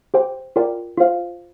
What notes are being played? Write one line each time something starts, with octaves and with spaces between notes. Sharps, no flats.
G4 C5 G5
F4 A#4 D5 G5
F4 C5 F5